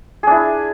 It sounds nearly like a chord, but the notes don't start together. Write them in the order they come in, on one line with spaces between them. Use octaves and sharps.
G#4 D4 E4